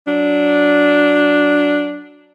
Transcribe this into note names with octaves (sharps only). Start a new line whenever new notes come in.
F#3 D4